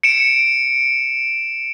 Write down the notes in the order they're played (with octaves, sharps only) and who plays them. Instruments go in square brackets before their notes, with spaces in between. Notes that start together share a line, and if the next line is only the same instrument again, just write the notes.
[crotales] C#7 D7 E7